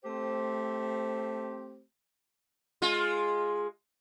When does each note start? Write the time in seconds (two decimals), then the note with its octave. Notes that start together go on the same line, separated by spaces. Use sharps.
0.04 A3 C4 G4 C5
2.82 G#3 F4